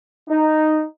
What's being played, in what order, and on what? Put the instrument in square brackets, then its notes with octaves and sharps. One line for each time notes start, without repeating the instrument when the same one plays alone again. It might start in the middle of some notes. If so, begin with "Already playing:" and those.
[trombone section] D#4